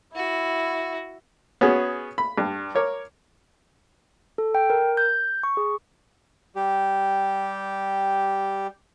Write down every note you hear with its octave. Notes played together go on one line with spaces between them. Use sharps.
E4 F#4
B3 C#4 F#4 G#4
B5
G2
A#4 C#5 D6
A4
G5
A#4
G6
C#6
G#4
G3 G4